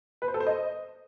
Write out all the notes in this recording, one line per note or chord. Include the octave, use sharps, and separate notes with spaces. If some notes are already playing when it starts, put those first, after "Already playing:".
B4
C5
A4
C5
D#5